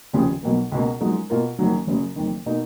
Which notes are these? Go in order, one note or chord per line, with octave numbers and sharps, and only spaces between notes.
F1 D#2 C#3 F3
B1 B2 A#3
C#2 B2 A#3
F#2 F3 G#3 D#4 F#4
B2 A#3 F4 A#4
F#1 F#2 D#3 F#3
F#1 F#2 C#3 F#3
F#1 F2 D#3
B2 A#3 D#4